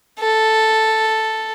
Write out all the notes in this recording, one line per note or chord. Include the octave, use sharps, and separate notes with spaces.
A4